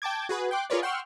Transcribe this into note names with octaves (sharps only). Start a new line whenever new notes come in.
G5 A5 D6 G#6
F#4 G#4 B4
G5 C6 D6 F#6
F4 G#4 A#4 B4 C#5 D5
F#5 G5 C6 C#6 E6 F6